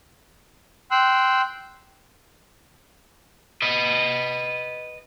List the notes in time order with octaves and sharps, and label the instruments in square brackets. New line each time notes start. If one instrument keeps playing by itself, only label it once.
[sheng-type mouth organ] G5 C6 E6 F#6
[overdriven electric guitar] B4 D#5